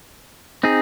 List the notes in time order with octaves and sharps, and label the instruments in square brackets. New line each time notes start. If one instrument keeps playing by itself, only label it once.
[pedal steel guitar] C4 D#4 G#4